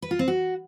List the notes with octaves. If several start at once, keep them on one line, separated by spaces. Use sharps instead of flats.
B4
F4
C4
F#4